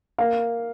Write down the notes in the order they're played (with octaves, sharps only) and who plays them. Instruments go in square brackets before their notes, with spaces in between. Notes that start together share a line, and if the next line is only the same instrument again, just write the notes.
[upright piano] A#3 F5